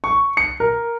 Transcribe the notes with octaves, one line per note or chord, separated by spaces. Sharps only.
C#6
C#7
A#4